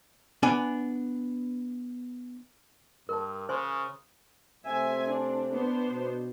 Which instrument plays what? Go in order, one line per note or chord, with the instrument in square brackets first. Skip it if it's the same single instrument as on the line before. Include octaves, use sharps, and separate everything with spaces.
[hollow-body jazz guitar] B3 D4 G#5
[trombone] G2 [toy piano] A#4 A5
[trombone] C#3 [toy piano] C5 G#5 C6
[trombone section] C3 A3 C4 [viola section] E5 G#5
[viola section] D4
B3 D4 C5
[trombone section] B2